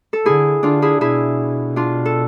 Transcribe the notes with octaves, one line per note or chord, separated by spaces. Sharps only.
A4
D3 E4 G#4
D3 D4 F4
E4 G#4
B2 E4 G#4
D4 F4
A4